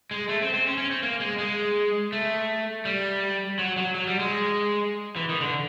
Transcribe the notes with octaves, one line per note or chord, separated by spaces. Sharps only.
G#3
A3
C4
C4
C#4
C#4
C4
A#3
G#3
G#3
A3
G3
F#3
F#3
F#3
G3
G#3
E3
D#3
D3